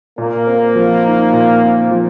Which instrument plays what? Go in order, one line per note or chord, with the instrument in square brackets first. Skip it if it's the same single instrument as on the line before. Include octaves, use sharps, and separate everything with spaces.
[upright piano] A#2 [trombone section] A#3
[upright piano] C4
F3
D#4
A#2
C4
F3